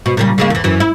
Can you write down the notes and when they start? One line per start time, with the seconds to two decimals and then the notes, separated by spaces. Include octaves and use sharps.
0.06 B2
0.17 A#2 C#3 G3
0.38 C#3 G#3 A#3
0.50 E2 E3
0.64 F#2 E3
0.80 E4